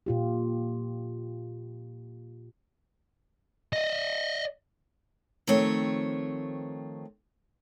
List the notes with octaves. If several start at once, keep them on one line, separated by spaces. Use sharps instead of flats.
A#2 F4 G4
D5 D#5
D#3 F3 A3 C4 C#5